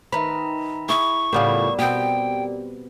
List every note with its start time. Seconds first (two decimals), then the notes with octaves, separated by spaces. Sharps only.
0.12 D#3 B4 E5 A#5 B5
0.89 E4 G#4 C#6
1.33 A2 C#3 G3 B3 F4 G4 A#4 D5
1.79 B2 B3 C4 G4 G5